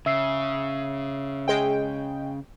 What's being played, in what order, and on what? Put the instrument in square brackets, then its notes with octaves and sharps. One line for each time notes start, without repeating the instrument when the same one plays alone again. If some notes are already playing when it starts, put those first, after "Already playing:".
[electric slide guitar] C#3 [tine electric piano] E5 E6 C7
[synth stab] G#3 G5